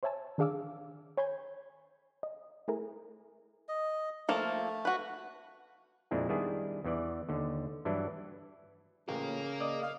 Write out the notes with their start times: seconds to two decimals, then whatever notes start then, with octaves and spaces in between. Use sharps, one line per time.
0.03 C5 C#5 E5 G#5 A5 E6
0.38 D#3 D4 G#4 F5 D6 E6
1.17 C#5 G#5 B5 C6 G6 G#6
2.23 D#5
2.68 A3 E4 G#4 A#4
3.68 D#5
4.29 F3 A3 A#3 A4
4.85 F#4 B4
6.11 F2 A#2 G#3 C4 D4 E4
6.29 D#3 G3 B3 D4 E4 G#4
6.84 E2 E3 D5
7.29 D#2 D3
7.85 G2 E3 F#3 D4 E4
9.09 A1 A#2 C#3 A#4 F5
9.60 D5 D#5
9.82 F5